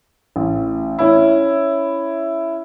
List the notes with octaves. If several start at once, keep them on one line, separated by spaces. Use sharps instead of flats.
A1
C#4 E4